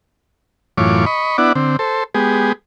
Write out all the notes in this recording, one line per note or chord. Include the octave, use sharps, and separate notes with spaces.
F#2 A2 E3 F4 C#5 D6
D#5 B5 C#6
B3 D4 E4 D5 F#5
D3 C4
A4 C5
G#3 B3 G4 G#4